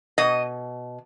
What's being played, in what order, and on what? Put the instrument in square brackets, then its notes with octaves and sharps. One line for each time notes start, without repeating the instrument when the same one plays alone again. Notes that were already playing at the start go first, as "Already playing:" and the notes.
[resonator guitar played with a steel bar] B2 D#5